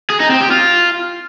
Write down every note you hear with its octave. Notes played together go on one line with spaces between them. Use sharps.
G#4
D#4
C4
G4
F4